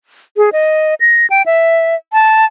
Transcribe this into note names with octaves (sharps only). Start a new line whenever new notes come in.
G#4
D#5
A#6
G5
E5
A5